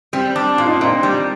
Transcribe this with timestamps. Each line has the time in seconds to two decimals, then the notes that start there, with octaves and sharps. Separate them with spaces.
0.13 G3 C4
0.36 D4
0.58 A#2 F4
0.66 D#4
0.73 D4
0.81 A#2 C4
1.03 G3